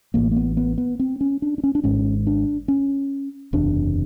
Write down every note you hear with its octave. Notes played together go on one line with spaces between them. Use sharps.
A1 A2 A#3
A#3
B3
B3
B3
C4
C#4
D4
D4
C#4
D4
G#1 G#2 C#4
D4
C#4
F#1 E2 C3 D4